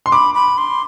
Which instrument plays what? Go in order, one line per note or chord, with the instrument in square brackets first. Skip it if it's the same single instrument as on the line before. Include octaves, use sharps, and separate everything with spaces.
[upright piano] C6
[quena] B5 [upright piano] D6
[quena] B5
C6